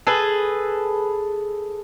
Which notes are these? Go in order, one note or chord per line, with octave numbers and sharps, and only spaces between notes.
G#4 A4 B4